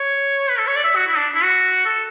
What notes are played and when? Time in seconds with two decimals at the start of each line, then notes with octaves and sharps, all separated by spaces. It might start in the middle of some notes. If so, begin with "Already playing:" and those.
Already playing: C#5
0.50 B4
0.58 A4
0.67 C#5
0.76 D5
0.84 E5
0.96 F#4
1.07 E4
1.17 D4
1.35 E4
1.43 F#4
1.86 A4